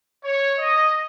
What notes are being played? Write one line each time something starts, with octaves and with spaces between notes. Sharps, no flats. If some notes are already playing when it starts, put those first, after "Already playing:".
C#5
D#5